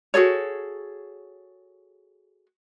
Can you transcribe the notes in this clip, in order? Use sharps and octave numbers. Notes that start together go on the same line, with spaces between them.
F#4 G#4 A4 C#5